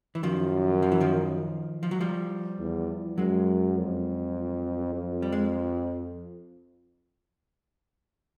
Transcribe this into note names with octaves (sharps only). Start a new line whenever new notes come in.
E3
F#2 D#3 F3
F3
E3
D#3 F3
F3
F#3
F3 G3
E2
F#2 F#3 G#3
F2
F2
G3
G#3